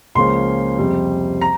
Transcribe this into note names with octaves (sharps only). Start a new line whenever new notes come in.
C#2 C#3 F3 A#3 C#4 C6
F2 C3 G3
A#5